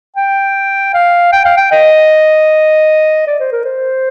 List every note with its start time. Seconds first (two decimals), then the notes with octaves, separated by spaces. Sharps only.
0.16 G5
0.94 F5
1.33 G5
1.45 F5
1.57 G5
1.72 D#5
3.27 D5
3.40 C5
3.52 A#4
3.65 C5